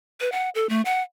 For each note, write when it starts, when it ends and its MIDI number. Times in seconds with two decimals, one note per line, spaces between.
0.21 0.32 71
0.32 0.49 78
0.55 0.69 69
0.69 0.82 57
0.85 1.02 78